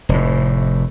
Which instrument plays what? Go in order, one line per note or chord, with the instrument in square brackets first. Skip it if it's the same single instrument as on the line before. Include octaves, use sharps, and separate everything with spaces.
[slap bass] F1 A2